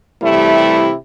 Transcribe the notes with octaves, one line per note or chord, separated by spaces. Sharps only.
C3 E3 G3 A3 E4